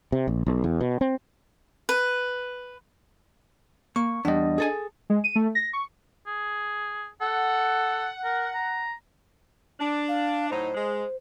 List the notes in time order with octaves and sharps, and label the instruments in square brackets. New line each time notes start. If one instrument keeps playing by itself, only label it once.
[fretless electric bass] C3
A#1
B1
E2
B2
C4
[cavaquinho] B4
[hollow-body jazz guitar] A#3 [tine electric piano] C#6
[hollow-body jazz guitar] E2 G3 [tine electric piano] D4 D#5
[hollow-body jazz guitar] G#4 A4 G#5
[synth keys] G#3
D#7
A3
A#6
C#6
[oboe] G#4
[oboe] A4 [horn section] F#5
[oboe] A#4
A#5
[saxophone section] D4
[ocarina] F5
[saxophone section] A2 F#3 D#4 [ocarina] C5
[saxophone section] G#3